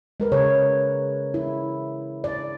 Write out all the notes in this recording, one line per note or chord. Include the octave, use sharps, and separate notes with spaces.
G#3 A#4 B4
C#3 B4 C#5
E4
D5